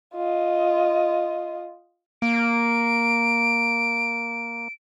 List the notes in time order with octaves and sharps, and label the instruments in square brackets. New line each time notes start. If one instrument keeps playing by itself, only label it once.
[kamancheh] F4 D#5
[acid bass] A#3 [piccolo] D7